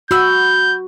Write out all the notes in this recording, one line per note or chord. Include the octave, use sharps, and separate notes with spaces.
F#4 B5 E6 G6